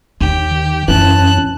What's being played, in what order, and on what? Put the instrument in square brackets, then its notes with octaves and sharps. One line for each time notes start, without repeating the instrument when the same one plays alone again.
[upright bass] D#2 [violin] G4
[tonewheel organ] D#3
[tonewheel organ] F#2 C#4 [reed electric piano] E3 [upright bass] D4 [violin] A5 F#6